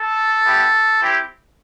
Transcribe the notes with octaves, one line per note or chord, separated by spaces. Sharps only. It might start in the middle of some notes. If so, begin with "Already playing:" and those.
Already playing: A4
B3 E4 G4
C4 E4 G4